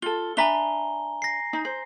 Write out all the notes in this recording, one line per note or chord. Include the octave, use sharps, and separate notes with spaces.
F4 A4 G7
D4 E5 G#5 A#5 B5 G7
A#6 C7
D#4
C5